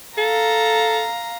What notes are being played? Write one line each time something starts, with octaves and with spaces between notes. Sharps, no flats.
A4 F5 A#5